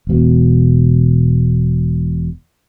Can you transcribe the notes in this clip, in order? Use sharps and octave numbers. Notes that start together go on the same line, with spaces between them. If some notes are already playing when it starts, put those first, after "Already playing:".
E1 B2